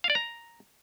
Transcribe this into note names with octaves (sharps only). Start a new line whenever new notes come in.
F5
D5
A#5